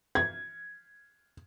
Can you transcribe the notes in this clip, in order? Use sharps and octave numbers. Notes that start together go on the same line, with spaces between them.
G#6